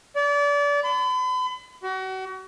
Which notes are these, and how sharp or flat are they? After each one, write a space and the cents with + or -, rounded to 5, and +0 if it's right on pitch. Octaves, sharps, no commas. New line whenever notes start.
D5 -30
B5 +40
F#4 +35